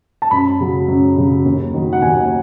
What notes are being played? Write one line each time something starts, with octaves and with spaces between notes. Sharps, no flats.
A5
F#2 B5
C#3 F#3
F#2
C#3 F#3
D#2
D#3 F#3
F#5
D#2 G#5